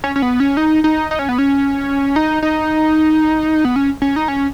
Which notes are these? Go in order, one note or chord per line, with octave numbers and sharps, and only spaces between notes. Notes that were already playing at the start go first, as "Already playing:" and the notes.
C#4
C#4
B3
C#4
D#4
D#4
D#4
C#4
B3
C#4
D#4
D#4
B3
C#4
C#4
D#4
C#4